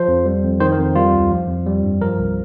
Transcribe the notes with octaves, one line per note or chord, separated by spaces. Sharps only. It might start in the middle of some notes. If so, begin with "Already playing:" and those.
Already playing: F3 C5
F2
G3
F2
D#3 C5
A#4
F2
G3 F4
D2
F3
F2
G3
G2
F3 A#4
C2